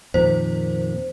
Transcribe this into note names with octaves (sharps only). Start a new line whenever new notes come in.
F2 A#2 D#3 C5